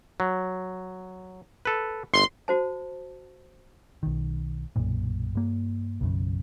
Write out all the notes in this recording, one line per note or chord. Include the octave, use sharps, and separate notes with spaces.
F#3
A4 B4
G1 C6
F#4 C5 A5
B1 D#3
B1 F#2 A#2
G2 A#3
B1 F#2 C#3